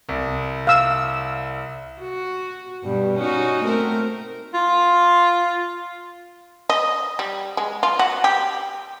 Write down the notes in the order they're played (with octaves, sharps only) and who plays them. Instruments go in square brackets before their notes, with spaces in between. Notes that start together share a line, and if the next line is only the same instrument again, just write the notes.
[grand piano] C2
[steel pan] F5 E6
[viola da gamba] F#4
G2 B2 G3
C#4 D#4 F#4
A3 C4 A#4
[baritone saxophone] F4
[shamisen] D#5
G3
G#3
F4
F#4
G4